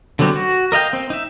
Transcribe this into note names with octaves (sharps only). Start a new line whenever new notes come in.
D3 F#3 G3 B3 C4
F#4
A#4 D#5 F5 G5
C4
D#4 E5